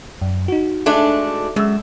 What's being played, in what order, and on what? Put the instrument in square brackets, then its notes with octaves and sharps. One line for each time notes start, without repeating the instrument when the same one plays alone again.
[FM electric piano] F#2
D#4 F#4
[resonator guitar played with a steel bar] G#3 A3 D4
[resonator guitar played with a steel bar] F#2 [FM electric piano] G#3 E6